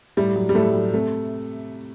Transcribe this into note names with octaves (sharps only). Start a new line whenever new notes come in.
A2 G3
F#3
G3
A2 A3
F#3
C3 A3